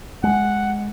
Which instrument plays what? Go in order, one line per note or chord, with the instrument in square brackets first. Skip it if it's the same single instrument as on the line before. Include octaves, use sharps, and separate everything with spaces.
[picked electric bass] G#3 [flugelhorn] F#5